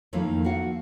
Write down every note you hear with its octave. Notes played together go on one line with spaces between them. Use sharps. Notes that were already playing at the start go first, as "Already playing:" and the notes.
F2 D#3 A3 A#3 E4 F4
F#4 F5 F#5